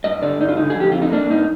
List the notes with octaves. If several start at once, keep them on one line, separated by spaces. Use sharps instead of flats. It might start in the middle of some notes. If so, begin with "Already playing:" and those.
G2 D#5
D3 D5
G2 D#4
F4
D3 D#4
G#4
F2 G4
C4 F4
D#4
A#3 D4
G2 D#4